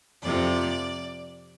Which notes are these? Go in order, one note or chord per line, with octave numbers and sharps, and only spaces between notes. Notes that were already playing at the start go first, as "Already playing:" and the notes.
F2 C3 F3 D5